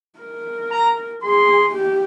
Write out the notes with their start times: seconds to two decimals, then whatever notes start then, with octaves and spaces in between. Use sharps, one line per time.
0.19 A#4
0.71 A#5
1.23 G#4 C6
1.75 G4